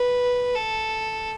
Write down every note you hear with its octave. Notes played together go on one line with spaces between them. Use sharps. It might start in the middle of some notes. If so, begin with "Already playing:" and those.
Already playing: B4
A4